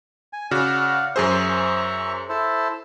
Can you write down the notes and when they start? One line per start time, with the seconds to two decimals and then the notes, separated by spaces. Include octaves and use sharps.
0.33 G#5
0.51 C#3 F#4 D5 F5 F#5
1.16 F#2 G#4 C5 E5 A#5 C#6
2.29 E4 A4 C5